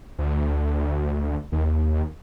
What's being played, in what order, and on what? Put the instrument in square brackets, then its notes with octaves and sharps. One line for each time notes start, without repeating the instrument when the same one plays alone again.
[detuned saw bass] D2
D#2